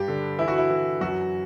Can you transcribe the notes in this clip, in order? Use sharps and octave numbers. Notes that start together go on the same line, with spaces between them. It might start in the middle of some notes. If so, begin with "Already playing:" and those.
Already playing: G2 G4
D3
E3 E4
F#4
E4
E3
F#2 F#4